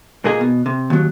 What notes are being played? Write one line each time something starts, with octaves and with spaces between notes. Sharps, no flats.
A#2 A#3 D#4 G#4
B2
C3
D#2 F#3